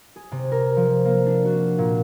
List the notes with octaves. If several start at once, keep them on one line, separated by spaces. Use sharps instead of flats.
G#4
C3
A#4
F3
A#3
D4
F#4
A#2